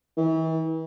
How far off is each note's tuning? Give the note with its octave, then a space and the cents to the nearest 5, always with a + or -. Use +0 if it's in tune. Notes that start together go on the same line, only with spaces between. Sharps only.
E3 -40